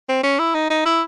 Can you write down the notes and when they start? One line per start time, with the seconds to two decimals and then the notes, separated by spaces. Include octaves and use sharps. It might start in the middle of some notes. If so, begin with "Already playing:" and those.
0.09 C4
0.23 C#4
0.39 E4
0.55 D#4
0.70 D#4
0.85 E4